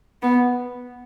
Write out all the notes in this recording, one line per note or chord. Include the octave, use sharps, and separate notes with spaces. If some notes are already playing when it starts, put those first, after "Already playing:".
B3